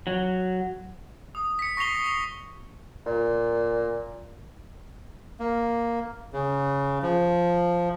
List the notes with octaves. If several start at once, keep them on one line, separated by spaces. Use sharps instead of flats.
F#3
D#6
B6 C#7
C#6 A#6 C7 F7 G7
C7 F7
A#2
A#3
C#3
F3